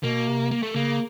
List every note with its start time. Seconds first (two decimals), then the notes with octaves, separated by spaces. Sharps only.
0.04 B2 A#3
0.27 C3
0.51 A#3
0.63 A3
0.75 C#3 A#3